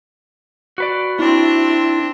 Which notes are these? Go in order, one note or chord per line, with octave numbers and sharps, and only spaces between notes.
F#4 B4 D5
C4 D4 E4